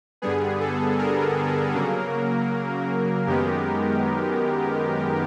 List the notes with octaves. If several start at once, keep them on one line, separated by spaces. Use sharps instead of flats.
G2 D3 G3 B3 G#4
A4
A#4
C#3 F#3 A#3
F#2 D#3 G#3 B3 G4